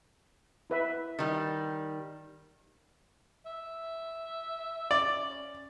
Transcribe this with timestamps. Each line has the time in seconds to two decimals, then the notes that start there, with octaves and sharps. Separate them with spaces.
0.70 E4 B4 E5
1.19 D#3 G3
3.46 E5
4.91 C#4 D5